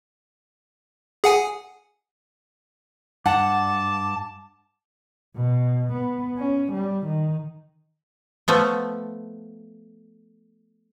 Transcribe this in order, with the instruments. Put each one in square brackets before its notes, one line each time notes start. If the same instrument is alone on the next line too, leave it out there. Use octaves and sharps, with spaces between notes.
[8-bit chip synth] G#4 F#5 G#5
[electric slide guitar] G2 [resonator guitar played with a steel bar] F#5 [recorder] A5 [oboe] D6
[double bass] B2
B3
C#4
G3
D#3
[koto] F3 A3 B3